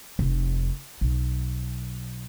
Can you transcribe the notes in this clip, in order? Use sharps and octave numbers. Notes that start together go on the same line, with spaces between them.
F1
B1